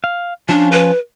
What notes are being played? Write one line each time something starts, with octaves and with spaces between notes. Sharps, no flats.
F5
F3 C#4 D4 F4
B4